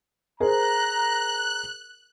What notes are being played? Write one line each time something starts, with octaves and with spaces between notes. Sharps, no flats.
G#4 A#4 C5 A#5 F#6